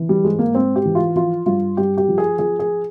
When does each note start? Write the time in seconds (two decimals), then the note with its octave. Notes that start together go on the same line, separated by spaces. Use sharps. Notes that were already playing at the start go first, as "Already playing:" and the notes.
Already playing: E3
0.09 G3
0.24 G#2 G#3
0.39 A#3
0.54 G#2 C4
0.76 G4
0.85 E3
0.95 F4
1.15 F3 F4
1.46 G2 F4
1.77 G2 G4
1.97 G4
2.08 F3
2.18 G#4
2.39 F3 G#4
2.59 G#4